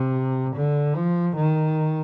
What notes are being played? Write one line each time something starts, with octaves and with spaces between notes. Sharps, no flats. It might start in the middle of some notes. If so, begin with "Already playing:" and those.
Already playing: C3
D3
F3
D#3